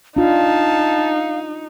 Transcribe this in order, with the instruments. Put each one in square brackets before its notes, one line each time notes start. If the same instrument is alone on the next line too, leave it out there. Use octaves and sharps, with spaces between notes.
[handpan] D4 F4 [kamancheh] D#4 [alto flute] F5 [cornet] A5